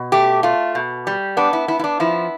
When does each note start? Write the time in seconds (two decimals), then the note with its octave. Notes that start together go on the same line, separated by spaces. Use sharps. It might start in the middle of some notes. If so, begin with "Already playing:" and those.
Already playing: B2
0.12 A3 G4
0.43 A3 F4
0.75 B2
1.07 G3
1.37 B3 D4
1.53 E4
1.68 B3 E4
1.79 E4
1.84 D4
2.00 F3 E4